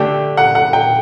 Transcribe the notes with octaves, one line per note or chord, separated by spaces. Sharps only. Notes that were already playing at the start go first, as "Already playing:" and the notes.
Already playing: D3 A3 D4 G4 G5
F#5
F#5
G5